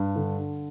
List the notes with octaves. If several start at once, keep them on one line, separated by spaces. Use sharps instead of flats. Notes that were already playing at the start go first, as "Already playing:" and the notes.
Already playing: G2
D3